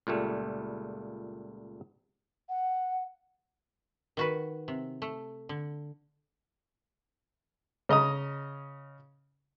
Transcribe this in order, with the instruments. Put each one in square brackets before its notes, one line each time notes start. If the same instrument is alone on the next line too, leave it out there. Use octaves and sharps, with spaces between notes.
[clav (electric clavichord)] C#2 A#2 G3 A3
[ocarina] F#5
[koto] D#3 F#4 B4
C3
A3
D3
[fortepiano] C#3 D#5 A#5 D#6